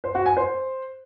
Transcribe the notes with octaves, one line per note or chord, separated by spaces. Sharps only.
C5
F#4
G#5
C5